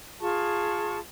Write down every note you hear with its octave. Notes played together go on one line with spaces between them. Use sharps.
F4 G#4 A5 C#6